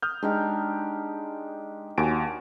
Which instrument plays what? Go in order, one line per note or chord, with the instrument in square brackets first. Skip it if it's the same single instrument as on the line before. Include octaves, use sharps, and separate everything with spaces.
[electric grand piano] D#6 F6 G6
[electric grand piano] G#3 [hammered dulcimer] D4 D#4 G4
[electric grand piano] D#2 G#5 D7 [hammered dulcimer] F#4 D6